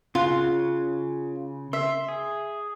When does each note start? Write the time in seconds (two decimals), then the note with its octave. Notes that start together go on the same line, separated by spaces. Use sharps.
0.15 C#3 F4 F#6
1.73 E5 C6
2.08 G#4